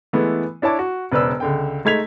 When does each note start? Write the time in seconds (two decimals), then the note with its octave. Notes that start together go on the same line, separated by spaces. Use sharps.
0.13 E3 G#3 A3 B3 E4
0.62 D4 E4 C#5 A5 D6
0.79 F#4
1.12 E1 C#3 B4 C5 D5 E6
1.40 C#2 D3 G5
1.85 G#3 A3 D#4 G#6 B6 F7